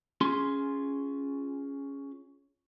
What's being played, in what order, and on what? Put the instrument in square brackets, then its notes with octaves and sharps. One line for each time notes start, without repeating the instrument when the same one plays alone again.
[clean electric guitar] C#4 F4 G#4 C6